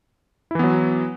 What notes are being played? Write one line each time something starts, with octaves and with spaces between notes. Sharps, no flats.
E3 F#3 B3 E4